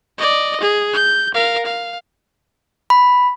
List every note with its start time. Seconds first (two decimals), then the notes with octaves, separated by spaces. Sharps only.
0.18 D5 D#5
0.61 G#4
0.94 G6
1.34 A#4 F5
1.66 F5
2.90 B5